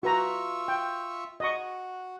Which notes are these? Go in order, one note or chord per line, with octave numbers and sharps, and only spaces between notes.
F4 F#4 B4 E5 A#5 C#6
G5
F#4 D#5 C#6